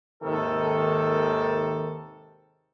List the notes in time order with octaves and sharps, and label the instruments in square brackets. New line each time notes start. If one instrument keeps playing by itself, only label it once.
[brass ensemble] D#2 G#2 C3 D#3 A4